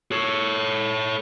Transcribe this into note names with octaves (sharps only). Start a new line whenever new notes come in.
A4 C#5